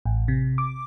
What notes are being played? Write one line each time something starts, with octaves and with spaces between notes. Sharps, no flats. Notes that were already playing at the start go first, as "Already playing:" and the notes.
A1
C3
D6